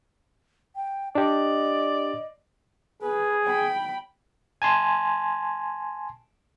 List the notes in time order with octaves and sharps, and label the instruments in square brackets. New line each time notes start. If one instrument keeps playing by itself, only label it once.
[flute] G5
[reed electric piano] D4 G4 [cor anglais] D5 [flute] D#5
[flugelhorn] G#4 [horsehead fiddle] B4
[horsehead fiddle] G5 B5
[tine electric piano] G#5 A5 C6